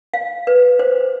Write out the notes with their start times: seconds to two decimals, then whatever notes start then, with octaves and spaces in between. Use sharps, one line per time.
0.14 F5
0.47 B4
0.79 C5